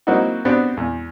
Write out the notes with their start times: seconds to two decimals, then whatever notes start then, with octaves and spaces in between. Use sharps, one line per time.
0.07 F#3 A#3 C4 D#4 E4 F#4
0.45 B3 C4 D4 F#4 G4
0.77 E2